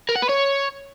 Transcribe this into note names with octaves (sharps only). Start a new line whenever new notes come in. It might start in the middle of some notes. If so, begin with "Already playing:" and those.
A#4
F#5
B4
C#5